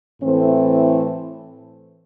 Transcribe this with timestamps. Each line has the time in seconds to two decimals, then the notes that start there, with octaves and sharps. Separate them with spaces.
0.21 A2 E3 A3 C4